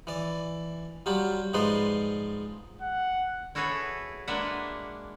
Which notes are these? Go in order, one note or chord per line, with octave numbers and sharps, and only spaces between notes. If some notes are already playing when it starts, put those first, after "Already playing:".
E3 D5
F#3 G3 F4 G4
G#2 F3 G#3 B4 D5 C6
F#5
E4 F#4 G#4 A4 B4 C#5
G#3 A#3 D4 B4 E5 F#5